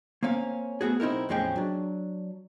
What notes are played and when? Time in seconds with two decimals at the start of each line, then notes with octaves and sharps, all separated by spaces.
0.23 A#3 C4 C#4 F5
0.81 A3 B3 F#4 G#4
1.00 B1 C4 D#4 E4 A#4
1.29 E2 A2 F3 G#3 C#4 G5
1.56 F#3 D4